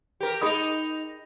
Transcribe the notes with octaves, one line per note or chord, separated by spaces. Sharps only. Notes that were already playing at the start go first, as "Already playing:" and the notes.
G4 A#4
D#4 G#4 D#5 B5 D#6 F7